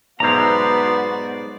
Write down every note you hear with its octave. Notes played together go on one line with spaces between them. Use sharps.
B1 G#2 B3 F#4 C5 D5 E5 A#5